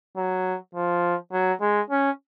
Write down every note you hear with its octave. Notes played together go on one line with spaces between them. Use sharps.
F#3
F3
F#3
G#3
C#4